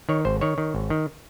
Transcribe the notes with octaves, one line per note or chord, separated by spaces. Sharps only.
D#3 C#5
G#1 C5
D#3 C#5
D#3
G#1
D#3